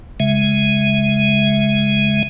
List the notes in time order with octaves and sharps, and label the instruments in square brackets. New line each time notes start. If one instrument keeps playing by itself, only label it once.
[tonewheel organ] C#3 G#3 E5